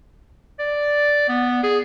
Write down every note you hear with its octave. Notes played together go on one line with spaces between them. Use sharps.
D5
B3
G#4